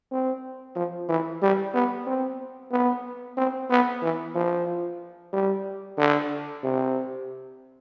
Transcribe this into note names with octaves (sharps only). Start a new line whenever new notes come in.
C4
F3
E3
G3
B3
C4
B3
C4
B3
E3
F3
G3
D3
C3